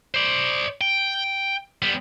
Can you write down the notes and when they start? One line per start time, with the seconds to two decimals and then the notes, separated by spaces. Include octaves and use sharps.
0.14 C5 D5
0.81 G5
1.82 G3 B3